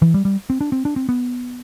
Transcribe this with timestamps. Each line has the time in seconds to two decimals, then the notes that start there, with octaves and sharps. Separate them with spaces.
0.02 E3
0.14 G3
0.25 G3
0.50 C4
0.61 D4
0.72 C4
0.85 D4
0.96 C4
1.09 B3